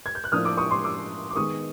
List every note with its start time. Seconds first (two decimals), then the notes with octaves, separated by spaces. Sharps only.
0.06 G#6
0.15 G6
0.24 F#6
0.32 A2 F3 A#3 D4 D#6 F6
0.45 D6 E6
0.57 C#6 D#6
0.70 C6 D6
0.84 D6 E6
1.30 D6
1.36 D#3 G#3 B3 C#6 D#6